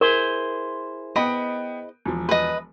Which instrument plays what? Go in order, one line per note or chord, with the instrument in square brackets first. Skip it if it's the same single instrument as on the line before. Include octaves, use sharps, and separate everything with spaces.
[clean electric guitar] E4 G#4 C5 [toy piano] A#4
[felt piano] B3 G5 D7 [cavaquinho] D#5 B5
[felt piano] E1 F3
[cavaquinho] B4 D#5